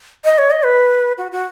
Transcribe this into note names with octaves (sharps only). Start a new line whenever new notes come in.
D#5
C#5
D#5
B4
F#4
F#4